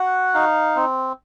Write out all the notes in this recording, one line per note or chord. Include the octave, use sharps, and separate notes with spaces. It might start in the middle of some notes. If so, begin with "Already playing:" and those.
Already playing: F#4 F#5
D#4 F5
C4